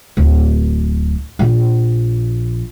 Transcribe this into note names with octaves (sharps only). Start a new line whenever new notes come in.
D1
A#1